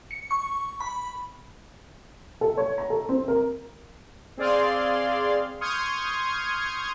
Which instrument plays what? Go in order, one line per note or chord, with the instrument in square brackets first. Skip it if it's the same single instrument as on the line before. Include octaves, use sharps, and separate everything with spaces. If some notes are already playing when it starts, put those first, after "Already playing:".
[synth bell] C#7
C#6
B5
[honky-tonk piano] A4
C#5
A#5
A4
C4
A#4
[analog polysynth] C4 G#4 D5 F5 C6
C6 C#6 D#6 F6 G6 G#6